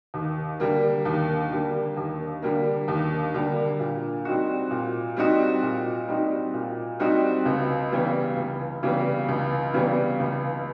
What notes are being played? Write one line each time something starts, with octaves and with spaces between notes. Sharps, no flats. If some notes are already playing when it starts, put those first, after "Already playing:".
D#2
D3 G3 A#3
D#2
D3 G3 A#3
D#2
D3 G3 A#3
D#2
D3 G3 A#3
A#2
G3 C4 D#4 F#4
A#2
G3 C4 D#4 F#4
A#2
G3 C4 D#4 F#4
A#2
G3 C4 D#4 F#4
C#2
C#3 E3 G3 B3
C#2
C#3 E3 G3 B3
C#2
C#3 E3 G3 B3
C#2